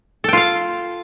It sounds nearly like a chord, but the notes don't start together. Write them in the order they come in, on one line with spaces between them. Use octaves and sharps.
A4 G5 F4 F5